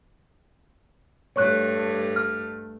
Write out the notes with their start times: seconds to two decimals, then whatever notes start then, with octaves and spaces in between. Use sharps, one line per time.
1.36 G2 A3 C#5 C#6 F#6
2.16 F6